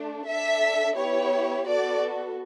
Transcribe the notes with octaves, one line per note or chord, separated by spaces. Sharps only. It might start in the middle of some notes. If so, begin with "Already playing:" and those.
Already playing: A3 D4
D4 A4 E5
B3 E4 G4 C#5
B3 F#4 A4 D5